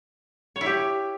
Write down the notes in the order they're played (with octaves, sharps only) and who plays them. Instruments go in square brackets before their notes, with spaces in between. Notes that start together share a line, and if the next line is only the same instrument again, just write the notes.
[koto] C#5
E4
G4